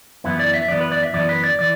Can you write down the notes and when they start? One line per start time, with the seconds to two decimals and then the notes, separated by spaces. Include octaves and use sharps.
0.24 F#2 E3 B3 E4
0.39 D5
0.54 E5
0.68 F#2 E3 B3 D5
0.81 B4
0.92 D5
1.03 E5
1.14 F#2 E3 B3 D5
1.29 B4
1.44 D5
1.59 E3 D5